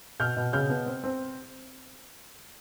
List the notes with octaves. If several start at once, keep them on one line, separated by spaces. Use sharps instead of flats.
B2 F6 G6
B2
C#3 F6 G6
B3
C4
C4